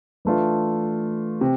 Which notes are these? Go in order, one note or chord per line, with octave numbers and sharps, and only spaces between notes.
E3 A3 D4 F4
C3